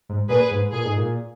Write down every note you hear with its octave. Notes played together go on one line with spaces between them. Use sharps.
G#2
A#2 G#4 B4
G#2
A#2 G#4
G#2
A#2